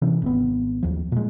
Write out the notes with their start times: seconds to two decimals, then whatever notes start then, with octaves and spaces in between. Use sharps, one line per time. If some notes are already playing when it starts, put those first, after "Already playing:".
0.02 C3 E3 C#4
0.22 G#1 C3 B3
0.83 D#2 F3
1.12 A#2 G#3